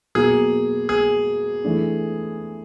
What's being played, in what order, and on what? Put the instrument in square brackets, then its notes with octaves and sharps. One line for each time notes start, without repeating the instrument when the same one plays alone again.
[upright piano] B2 F#3 A#3 [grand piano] G#4
[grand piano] G#4
[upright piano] E3 A3 D4